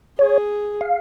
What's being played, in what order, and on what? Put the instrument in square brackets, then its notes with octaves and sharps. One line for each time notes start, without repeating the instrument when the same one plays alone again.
[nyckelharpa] G#4 [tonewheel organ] C#5
[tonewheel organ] F5